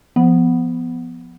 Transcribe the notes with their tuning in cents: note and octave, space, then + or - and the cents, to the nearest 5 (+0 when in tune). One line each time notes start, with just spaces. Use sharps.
F3 -10 B3 +0